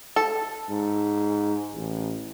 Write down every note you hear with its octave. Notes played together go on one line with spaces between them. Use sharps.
A4
G#2
A1